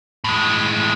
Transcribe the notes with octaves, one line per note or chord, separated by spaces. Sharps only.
A2 G#3